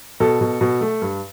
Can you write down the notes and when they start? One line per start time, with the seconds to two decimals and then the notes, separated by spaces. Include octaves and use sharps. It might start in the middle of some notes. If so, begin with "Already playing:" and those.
0.20 B2 A4
0.41 B2
0.61 B2
0.81 A3
1.02 G2